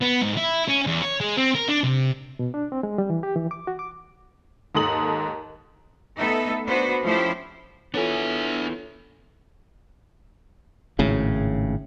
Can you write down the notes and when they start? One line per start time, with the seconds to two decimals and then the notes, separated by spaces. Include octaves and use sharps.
0.01 B3
0.22 G#2
0.37 E4
0.68 C#4
0.87 E2
1.02 C#5
1.21 G#3
1.37 C4
1.55 A#4
1.68 D4
1.84 C3
2.39 B2
2.54 D4
2.72 C4
2.83 G#3
2.98 G3
3.10 E3
3.23 G4
3.36 E3
3.51 D6
3.67 F#4
3.79 D6
4.75 D#2 G#2 A4 D#6 F#7
6.18 A3 B3 D#4 A4 E5
6.66 B3 D4 F#4 B4 C5
7.03 F3 A3 C#4 E4 G4 C5
7.94 B3 D4 E4 F4 A4 C#5 G#5
10.99 G#1 A2 C#3